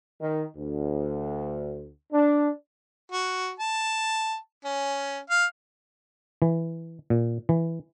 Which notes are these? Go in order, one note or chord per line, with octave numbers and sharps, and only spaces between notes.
D#3
D2
D4
F#4
A5
C#4
F5
E3
A#2
E3